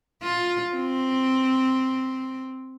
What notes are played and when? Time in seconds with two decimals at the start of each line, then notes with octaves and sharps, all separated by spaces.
0.23 F4
0.74 C4